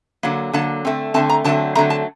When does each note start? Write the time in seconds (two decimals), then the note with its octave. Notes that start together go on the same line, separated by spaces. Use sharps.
0.23 D3 F#3 A#3
0.53 D3 F#3 A#3 A5
0.85 D3 A3 C4
1.14 D3 A3 C4 A5
1.29 A#5
1.44 D3 F#3 A3 C4 A5
1.75 D3 F#3 A3 C4 A#5
1.90 A5